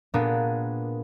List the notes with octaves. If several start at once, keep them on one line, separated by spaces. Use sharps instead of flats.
A#2 A#3 B3 D4 G#4